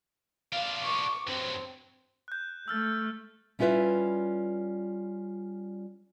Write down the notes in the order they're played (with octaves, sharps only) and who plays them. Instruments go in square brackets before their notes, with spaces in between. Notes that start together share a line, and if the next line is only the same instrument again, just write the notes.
[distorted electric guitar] D4 F4 [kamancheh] F5
[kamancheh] C#6 D6
[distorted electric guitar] G2 F#3 [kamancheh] C4
[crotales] F#6 G6
[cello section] A3 [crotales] E6 F6 A6
[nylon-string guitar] G3 C#4 E4 F4 B4 E5